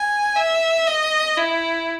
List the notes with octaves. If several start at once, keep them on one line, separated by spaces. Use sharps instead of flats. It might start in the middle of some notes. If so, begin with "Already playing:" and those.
Already playing: G#5
E5
D#5
E4